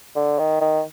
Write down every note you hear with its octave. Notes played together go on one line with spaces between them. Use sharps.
D3
D#3
D#3